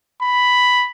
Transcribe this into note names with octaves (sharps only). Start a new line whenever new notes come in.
B5